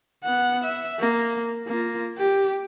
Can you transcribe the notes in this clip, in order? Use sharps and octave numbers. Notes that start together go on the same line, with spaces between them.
B3 F#5
E5
A#3
A#3 F4
G4